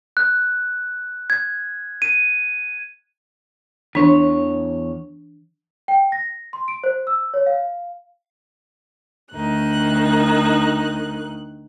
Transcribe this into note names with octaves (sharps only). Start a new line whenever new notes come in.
F#6
G#6
D#7
E2 E3 D4 C#5
G5
A#6
C6
D7
C5
E6
C#5
F5
D2 D#3 D#4 F#6